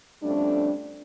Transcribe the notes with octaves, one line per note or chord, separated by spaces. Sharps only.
F2 G3 A3 C#4 D4